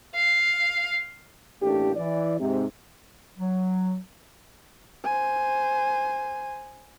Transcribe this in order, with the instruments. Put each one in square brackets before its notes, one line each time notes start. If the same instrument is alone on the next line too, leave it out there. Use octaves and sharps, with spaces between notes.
[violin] F5
[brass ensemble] A1 A3 A#3 D4 G4
E3 D5
G#2 C3
[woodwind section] F#3
[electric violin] C5 G#5